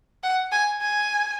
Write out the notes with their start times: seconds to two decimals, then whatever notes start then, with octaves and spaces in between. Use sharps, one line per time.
0.23 F#5
0.52 G#5
0.81 G#5